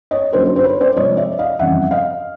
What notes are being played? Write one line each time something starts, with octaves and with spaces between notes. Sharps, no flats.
C#5 D#5
F#2 D3 F#3 A#3 D#4 A#4 C5
C5
B4 C#5
C5 D5
C3 F3 G#3 C#5 D#5
D5 E5
D#5 F5
F2 C#3 E3 G3 C4 E5 F#5
D#5 F5